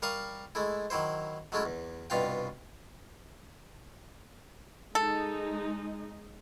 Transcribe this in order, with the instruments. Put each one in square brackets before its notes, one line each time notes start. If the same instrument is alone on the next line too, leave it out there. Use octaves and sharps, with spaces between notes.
[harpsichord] G3 A#4 F5 C#6 D#6
G#3 A3 E4
D#3 F#3 E4 C5
F#3 G#3 A3 C#4 E4
E2
C2 G2 B2 F4 F5 G5
[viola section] G#3 D#4 [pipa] A4